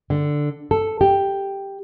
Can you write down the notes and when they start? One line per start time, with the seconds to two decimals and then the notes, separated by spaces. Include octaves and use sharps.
0.10 D3
0.71 A4
1.01 G4